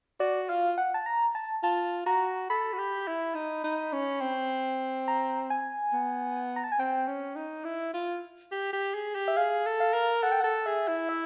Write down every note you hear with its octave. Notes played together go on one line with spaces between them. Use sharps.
F#4 D5
F4 F5
F#5
A5
A#5
A5
F4 A5
F#4 A#5
A4 B5
F#4
G4
E4
D#4
D#4
C#4
C4
A#5
G#5
B3
A#5
A5
G#5
C4 G5
C#4
D#4
E4
F4
G4
G4
G#4
G4
E5
G#4 F5
A4
F5
A#4
A4 F#5
G5
A4 F#5
G#4 E5
E4
E5